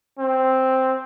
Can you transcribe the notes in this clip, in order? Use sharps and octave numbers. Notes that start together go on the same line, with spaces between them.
C4